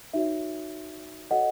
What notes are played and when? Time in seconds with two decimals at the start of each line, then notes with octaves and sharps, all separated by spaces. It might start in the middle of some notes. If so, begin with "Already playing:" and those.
0.14 D#4 F#4 C#5 E5
1.31 F#4 A4 C#5 D#5 F#5